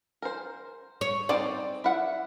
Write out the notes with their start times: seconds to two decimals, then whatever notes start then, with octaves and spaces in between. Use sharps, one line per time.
0.22 A#4 C5
1.01 C#5
1.29 C4 D#4 C5 D5
1.84 E4 F#5